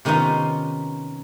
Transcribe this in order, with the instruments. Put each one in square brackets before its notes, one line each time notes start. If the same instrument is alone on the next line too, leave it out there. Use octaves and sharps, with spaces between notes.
[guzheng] C3 D#3 B3 C#4 D#4 F4